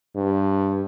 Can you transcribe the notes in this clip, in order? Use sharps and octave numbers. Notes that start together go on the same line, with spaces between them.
G2